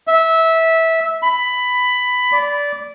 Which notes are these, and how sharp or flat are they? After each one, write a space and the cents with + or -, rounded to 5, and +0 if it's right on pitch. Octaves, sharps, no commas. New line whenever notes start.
E5 -15
B5 +10
D5 -20